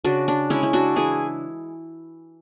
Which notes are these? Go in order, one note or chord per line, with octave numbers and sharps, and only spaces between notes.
C#3 D4 F#4
D4
G#3 C#4 E4
E4
D4 F#4
E3 E4 G#4